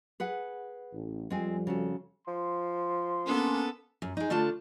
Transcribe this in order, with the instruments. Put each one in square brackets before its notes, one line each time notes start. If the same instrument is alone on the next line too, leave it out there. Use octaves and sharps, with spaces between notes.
[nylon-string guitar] G#4 B4 F#5
[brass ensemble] A1
[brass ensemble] F2 F3 G3 [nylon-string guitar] G#3 C4 G#5
[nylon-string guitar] C#3 F#4 A4
[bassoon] F3 [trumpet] C6
[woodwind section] A#3 C#4 D4 [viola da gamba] B3 A4
[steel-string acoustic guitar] F#2
G#3 D#4
D3 A3 D4 F4 A5